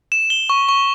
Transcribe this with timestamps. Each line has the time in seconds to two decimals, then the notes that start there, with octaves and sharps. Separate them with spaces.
0.12 E7
0.30 G7
0.50 C#6
0.69 C#6